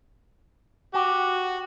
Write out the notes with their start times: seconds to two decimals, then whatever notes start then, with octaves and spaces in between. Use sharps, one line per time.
0.95 F#4 G4